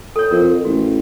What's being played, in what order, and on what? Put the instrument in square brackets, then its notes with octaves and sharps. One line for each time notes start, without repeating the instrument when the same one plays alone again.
[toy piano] A4 C#5
[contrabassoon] F2 [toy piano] A#4
[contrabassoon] A1 [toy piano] F#4